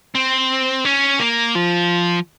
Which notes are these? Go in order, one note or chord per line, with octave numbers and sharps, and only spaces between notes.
C4
C#4
A#3
F3